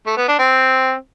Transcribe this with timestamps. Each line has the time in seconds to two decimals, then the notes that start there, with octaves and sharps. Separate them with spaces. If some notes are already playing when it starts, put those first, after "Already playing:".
0.06 A3
0.17 B3
0.28 D4
0.39 C4